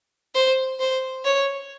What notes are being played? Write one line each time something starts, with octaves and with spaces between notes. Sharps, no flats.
C5
C5
C#5